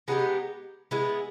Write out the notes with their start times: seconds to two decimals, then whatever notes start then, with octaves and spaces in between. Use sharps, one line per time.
0.08 G#3 B3 D#4 G4
0.91 G#3 B3 E4